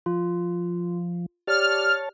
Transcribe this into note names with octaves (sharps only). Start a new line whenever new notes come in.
F3 F4
G4 C#5 D5 A5 F6